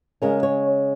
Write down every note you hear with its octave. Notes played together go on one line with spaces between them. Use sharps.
C#3 G#3 C#4 A#4
C#5